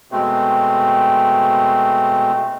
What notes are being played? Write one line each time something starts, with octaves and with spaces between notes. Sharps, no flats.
B2 G#3 A3 C4